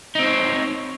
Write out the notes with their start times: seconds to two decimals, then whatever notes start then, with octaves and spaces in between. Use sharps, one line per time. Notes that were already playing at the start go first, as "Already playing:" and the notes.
0.15 D#4
0.19 C4
0.23 C5
0.27 C#5